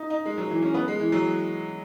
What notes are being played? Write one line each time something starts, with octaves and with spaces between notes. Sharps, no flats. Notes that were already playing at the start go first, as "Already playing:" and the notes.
Already playing: D#4
D#4
G#3
F#3
E3
C#4
B3
G#3
E3
F#3